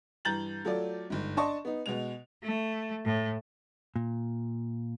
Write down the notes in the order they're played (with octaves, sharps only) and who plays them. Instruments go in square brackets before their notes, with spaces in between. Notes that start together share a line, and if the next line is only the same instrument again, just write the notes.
[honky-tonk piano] G2 E3 A#5 G6 A6 F#7
F#3 A3 F4 A4 D5
G1 G#2
D4 D5 D#5 A5 C6 C#6
B3 D#4
B2 G#3 F7
[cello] A3
A2
[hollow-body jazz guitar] A#2